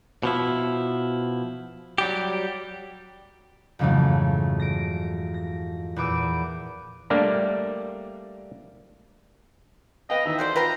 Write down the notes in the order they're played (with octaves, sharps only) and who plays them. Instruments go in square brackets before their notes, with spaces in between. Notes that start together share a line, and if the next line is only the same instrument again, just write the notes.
[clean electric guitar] B2 F3 E4
F#3 G3 G4
[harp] F2 G#2 C#3 E3 F#3 A3
A#6 D7
A#6
E2 A#2 B4 D6 E6 D7
[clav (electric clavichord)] G3 A3 A#3 D4 G4
[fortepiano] B4 F5 G5 [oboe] D#5
[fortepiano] D#3 E3 [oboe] E5
[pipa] F#4 A4 D5 [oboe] C5
[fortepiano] F4 [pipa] B4 G5 C6 [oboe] A#5